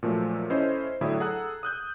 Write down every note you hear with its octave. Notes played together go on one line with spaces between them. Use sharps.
A#2 F3 F#3 A3
C#4 E4 A4 C5 D#5
A2 D3 F#3 E4 G5 D#6
G#4 A4 F#5 A#5 E6 F#6
D#6 F#6 G6